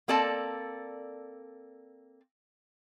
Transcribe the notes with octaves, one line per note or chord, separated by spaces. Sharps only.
A#3 C4 A4 D5 A5